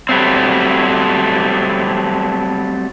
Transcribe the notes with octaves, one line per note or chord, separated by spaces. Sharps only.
F#3 G3 A3 C4